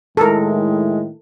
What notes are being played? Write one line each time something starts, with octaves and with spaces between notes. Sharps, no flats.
A2 D#3 G#3 E4 A4 A#4